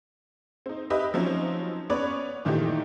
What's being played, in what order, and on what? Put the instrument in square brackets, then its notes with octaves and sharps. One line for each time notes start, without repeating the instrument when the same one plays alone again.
[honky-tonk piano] C4 D#4
G4 B4 D#5 E5
F3 F#3 C4 C#4 D#4
B3 C#4 B4 C#5 D5
A#2 D#3 E3 A3 D#4 G4